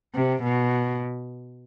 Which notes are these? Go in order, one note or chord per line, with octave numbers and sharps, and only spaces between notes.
C3
B2